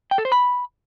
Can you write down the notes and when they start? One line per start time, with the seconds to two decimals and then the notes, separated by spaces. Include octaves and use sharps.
0.11 G5
0.18 A4
0.25 C5
0.32 B5